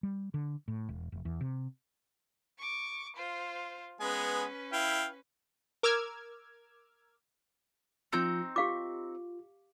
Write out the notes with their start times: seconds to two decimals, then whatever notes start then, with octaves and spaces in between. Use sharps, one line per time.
0.03 G3
0.34 D3
0.68 A2
0.89 E1
1.12 F1
1.25 E2
1.41 C3
2.58 C#6 D6
3.16 F4 C5
4.00 G#3 B3 C#4 B4 G#5
4.73 E4 F5 G5
5.83 A#4 D6 E6 F6 G#6
8.13 F3 C4 D#4 F4 G6 C#7
8.56 F4 G4 F5 D6